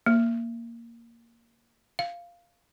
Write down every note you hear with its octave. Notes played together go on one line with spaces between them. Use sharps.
A#3
F5